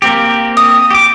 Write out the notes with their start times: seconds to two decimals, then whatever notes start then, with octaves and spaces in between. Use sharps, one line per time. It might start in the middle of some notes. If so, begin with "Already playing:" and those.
0.02 A#3 C4 G4
0.57 D#6
0.91 G4 D6